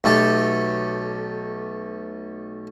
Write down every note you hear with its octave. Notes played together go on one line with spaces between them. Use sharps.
B1 A3 G4 A4